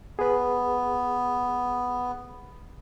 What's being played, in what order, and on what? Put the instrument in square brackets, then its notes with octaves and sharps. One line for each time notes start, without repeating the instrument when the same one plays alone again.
[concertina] B3 [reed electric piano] G#4 B4